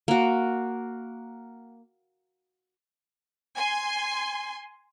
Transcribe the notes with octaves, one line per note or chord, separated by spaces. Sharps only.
A#3 F#4
G#5 C6